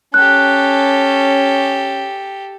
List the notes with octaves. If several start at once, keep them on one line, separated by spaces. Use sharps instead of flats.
C#4 G4 A4 F#6